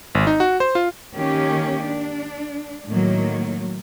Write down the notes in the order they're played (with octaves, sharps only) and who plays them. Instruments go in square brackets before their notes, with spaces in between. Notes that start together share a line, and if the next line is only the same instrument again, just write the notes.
[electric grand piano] G#1
D#4
F#4
C5
F4
[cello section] D#3 A#3 C#4 G4
D4
A2 D#3 F#3 A#3